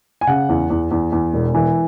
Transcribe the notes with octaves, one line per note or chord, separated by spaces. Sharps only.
G#5
C#3 F#5
E2
E2
E2
E2
E1
E3